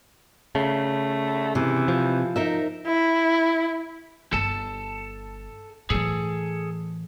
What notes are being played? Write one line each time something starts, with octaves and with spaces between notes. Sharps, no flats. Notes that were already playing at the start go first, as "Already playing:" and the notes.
C#3 A3
C3 E3
F3
D#4 A#4 E5
E4
G1 A4 A5
A2 E3 G#4 A4